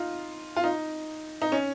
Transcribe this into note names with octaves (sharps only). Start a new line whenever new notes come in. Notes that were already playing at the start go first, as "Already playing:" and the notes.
Already playing: D#4 F4
F4
D#4
D#4
C#4